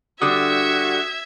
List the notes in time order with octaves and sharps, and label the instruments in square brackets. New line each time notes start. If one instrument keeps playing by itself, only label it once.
[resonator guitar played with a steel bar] D3 G3 [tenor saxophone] F#4 [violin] E5 G#6 [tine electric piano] D#6